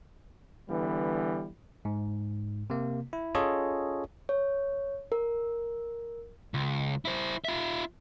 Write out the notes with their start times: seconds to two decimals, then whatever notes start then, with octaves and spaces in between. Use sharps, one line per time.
0.69 D3 E3 G3 B3
1.85 G#2
2.70 C3 A#3
3.13 E4
3.35 C#4 F4 G#4 A4 C#5 D#5
4.29 C#5
5.12 A#4
6.54 C#2
7.05 E4 C5
7.45 F4 E5